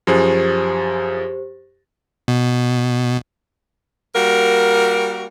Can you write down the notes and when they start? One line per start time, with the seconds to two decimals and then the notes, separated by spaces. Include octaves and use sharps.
0.07 F#2 F3 G4 G#4 C5
2.28 B2
4.15 G3 A#3 F#4 A#4